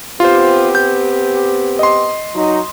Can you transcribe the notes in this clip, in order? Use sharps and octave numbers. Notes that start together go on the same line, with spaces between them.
B3 C4 F4 G4 C5
G6
D#5 C6
F#3 D#4